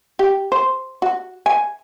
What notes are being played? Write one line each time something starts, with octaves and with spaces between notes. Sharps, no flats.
G4
C5
F#4
G#5